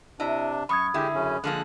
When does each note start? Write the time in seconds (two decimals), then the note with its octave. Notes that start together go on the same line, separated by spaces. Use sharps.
0.20 C3 D4 E4 D#5
0.69 F#2 B5 C#6 D#6 G#6
0.94 D3 G#3 E4 G4
1.15 F#2 C#3 C#4
1.44 D3 F3 G#3 A#3 F#6